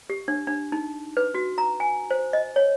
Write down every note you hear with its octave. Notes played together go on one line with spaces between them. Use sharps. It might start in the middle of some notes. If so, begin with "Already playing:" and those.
G4
D4
D4
D#4
B4
F#4
A#5
G#5
C5
D#5
C#5